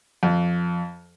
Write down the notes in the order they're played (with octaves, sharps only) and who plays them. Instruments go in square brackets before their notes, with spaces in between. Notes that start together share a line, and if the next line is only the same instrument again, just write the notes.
[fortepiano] F2